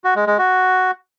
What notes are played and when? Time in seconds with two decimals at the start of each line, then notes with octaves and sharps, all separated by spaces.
0.04 F#4
0.16 G#3
0.27 G#3
0.38 F#4